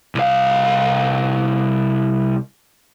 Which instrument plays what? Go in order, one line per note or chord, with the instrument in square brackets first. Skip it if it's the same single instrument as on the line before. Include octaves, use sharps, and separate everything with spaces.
[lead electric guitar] C2 F5